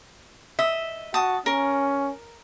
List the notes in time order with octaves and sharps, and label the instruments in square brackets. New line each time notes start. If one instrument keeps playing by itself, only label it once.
[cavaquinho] D#5 [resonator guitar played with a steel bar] E5
[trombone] F#4 [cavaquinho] A5 D#6
[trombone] C#4 [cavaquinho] A#4